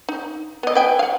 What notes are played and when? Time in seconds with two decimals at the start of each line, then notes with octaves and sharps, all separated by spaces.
0.09 D#4
0.63 B3 D#5
0.75 B4 G5 G#5
0.99 F5 F#5